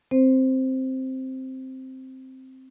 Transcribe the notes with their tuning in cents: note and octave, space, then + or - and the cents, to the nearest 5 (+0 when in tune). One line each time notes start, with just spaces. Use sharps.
C4 +0 C5 +0